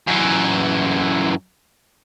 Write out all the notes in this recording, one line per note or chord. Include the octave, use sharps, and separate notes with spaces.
F#2 E3